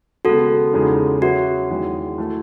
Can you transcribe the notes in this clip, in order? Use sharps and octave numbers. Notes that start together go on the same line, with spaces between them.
D#2 C#3 G#3 B3 F#4 A4
E2 C#3 G#3 D#4 G#4
F#3 C#4 F#4 G#4 B4 E5
E2 D#3 G#3
E3 A3 E4 A4